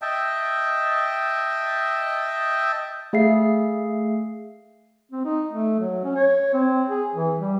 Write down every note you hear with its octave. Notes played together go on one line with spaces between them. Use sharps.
D#5 E5 G5 A5
A3 G#4 E5 F5 C7
C4
D#4
A3
F#3
C#4
C#5
C4
G#4
E3
G3